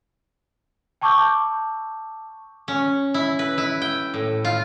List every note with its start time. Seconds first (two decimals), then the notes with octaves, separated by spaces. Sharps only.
1.01 G5 A5 C#6 D6 E6 G6
2.68 C#4
3.14 E4
3.39 B4
3.58 E4
3.82 G5
4.14 A2
4.45 F4